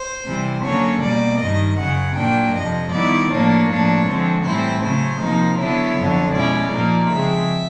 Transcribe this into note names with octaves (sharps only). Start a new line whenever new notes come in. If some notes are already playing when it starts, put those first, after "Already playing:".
Already playing: C5
C3 E3 G3
D3 F#3 A#3 C#4 C#5
B2 G3 A#3 D5
G2 D#3 G3 D#5
F#2 C#3 F#3 F#5
A#2 F#3 A#3 D4 G5
F2 C3 F3 D#5
D#3 G3 B3 E4 D5
A2 F3 A#3 D4 C#5
A2 F3 A#3 D4
D3 F3 G#3 C4
A2 E3 G3 C4 E4 C5
C#3 F#3 A3 C5
C3 F3 A#3 D#4
D3 F#3 B3 E4 C#5
F2 D3 F#3
B2 G#3 C#4 E4 D5
A#2 F3 A#3 D#4
C#3 F3 G#3 C4 E5